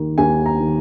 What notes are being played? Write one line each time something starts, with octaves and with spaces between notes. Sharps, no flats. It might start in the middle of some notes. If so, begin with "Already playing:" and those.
Already playing: D#2 D#3
D#2 G#5
A#5
D#3